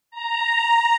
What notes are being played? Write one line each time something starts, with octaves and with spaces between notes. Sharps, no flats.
A#5